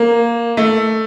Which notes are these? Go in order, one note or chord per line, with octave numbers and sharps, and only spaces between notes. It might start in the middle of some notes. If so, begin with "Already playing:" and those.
Already playing: A#3
A3